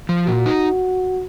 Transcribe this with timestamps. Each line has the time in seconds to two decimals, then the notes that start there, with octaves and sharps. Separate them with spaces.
0.09 F3
0.27 A#2 F#4
0.46 D#4